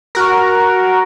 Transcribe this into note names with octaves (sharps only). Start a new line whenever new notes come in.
F#4 A#4